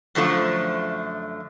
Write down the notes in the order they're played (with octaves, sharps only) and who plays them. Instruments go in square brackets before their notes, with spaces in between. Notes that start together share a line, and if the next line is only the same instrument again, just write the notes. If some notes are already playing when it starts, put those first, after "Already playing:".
[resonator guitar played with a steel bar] F#2 D3 F3 A3